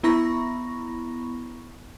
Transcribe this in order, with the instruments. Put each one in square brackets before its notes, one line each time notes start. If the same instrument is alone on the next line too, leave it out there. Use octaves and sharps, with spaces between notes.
[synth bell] B3 E4 A#5 B5 C#6 A#6